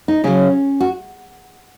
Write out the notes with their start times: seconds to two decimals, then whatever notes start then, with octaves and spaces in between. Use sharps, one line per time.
0.08 D#4
0.24 C#3 F#3 C#4
0.81 F#4